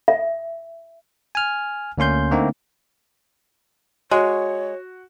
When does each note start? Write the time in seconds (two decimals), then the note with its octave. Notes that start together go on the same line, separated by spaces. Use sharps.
0.08 E5
1.35 G#5 F6
1.98 D2 A#3 C#4 C6 G6
2.31 D3 A3 A#3 C4 D#4
4.11 G#3 F#4 C#5